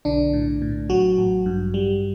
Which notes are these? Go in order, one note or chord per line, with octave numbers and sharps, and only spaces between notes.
B1 D3 D4
A2
A2
A1 F#3 F#4
A1
G2
G3